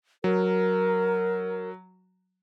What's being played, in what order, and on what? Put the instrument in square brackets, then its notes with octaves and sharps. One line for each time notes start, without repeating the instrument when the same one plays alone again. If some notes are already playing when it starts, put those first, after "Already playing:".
[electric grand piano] F#3 [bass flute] A#4